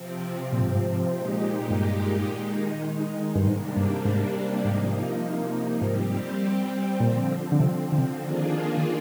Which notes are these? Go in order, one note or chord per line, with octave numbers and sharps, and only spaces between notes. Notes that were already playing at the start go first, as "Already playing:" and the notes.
Already playing: C3 F3 C4
A#2
G#2
G2
G#2
A#2 G#3 D#4 G4
G2
D#3 G#3 D#4
G2
G#2 C3 G3 A#3 D4
G2
G#2
G#2 C3 F3 A#3 D#4
G#2 G3 C4 G4
A#2 D3 F3 C4
D3
C3
D3
C3
D#3 A#3 D4 F4 G#4
D#3